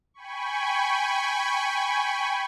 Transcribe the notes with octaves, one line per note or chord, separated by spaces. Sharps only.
G5 G#5 B5 C#6